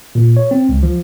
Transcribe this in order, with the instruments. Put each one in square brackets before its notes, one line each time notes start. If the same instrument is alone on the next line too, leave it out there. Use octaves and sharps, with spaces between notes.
[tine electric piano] A#2
C#5
C4
C#2
F3